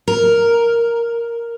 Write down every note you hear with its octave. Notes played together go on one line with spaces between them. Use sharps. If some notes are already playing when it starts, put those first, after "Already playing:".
A#4